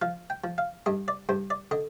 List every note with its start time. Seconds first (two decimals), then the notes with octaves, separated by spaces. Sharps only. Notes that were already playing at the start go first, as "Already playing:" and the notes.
0.02 F3 F5
0.30 G5
0.44 F3
0.58 F5
0.86 G2 D#5
1.08 D5
1.29 G2 C5
1.50 D5
1.71 D3 D#5